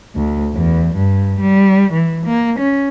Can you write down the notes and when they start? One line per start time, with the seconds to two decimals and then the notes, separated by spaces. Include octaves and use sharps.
0.15 D2
0.54 E2
0.96 G2
1.40 G3
1.93 E3
2.26 A#3
2.59 C#4